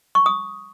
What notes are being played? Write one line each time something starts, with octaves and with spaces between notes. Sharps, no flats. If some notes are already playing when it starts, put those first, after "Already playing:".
C#6
D#6